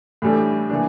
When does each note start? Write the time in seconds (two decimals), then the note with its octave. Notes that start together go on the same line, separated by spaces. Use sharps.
0.22 A2 E3 G3 D4 A4
0.69 E3 A#3 D4